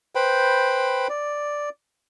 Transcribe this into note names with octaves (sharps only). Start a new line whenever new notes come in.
B4 C5 G5 B5
D5